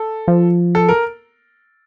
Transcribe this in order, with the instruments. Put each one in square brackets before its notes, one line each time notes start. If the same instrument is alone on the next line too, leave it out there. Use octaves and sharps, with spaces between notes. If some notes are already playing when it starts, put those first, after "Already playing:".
Already playing: [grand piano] A4
[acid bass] F3
[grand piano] A4
A#4